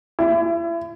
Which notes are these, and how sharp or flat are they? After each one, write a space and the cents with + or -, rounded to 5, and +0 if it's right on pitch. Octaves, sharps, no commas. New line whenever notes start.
E4 +35